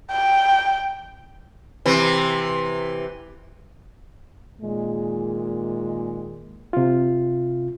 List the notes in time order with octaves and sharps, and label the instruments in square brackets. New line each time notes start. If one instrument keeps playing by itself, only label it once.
[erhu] G5
[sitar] C3 E3
[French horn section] A#2 D#3 G#3
[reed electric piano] C3 F4